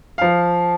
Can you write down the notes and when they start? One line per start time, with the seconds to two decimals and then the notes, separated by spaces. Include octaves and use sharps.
0.18 F3 F5